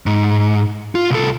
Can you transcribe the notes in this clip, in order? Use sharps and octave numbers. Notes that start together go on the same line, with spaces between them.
G#2
F4
C2 A4